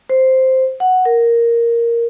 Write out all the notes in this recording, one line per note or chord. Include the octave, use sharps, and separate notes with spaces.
C5
F#5
A#4